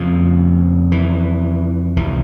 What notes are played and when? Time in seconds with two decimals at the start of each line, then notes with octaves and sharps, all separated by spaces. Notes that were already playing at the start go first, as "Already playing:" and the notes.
Already playing: F2 C#3 F3
0.92 E3
1.96 C#2 C3 E3